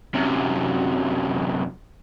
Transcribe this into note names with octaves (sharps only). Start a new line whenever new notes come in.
F#2 C3